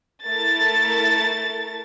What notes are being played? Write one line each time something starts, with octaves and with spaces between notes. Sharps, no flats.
A3 E4 A4 A#4 A6